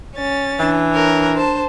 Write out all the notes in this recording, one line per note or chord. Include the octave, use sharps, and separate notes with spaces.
C#4 A6
E3 D4
A#4 C#5
C5 A5